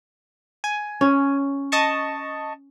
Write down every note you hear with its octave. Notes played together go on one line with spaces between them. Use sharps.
G#5
C#4
D#5 A5 C#6